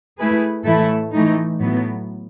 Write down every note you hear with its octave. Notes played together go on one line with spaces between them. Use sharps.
A3 E4 G#4 B4
A2 E3 A3 E4 A4
E3 A3 D#4
A2 F#3 B3